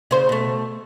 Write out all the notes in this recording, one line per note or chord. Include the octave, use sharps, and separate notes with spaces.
C#3 C5
B2 A3